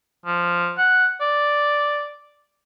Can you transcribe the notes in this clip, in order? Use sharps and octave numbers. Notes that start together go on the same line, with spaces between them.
F3
F#5
D5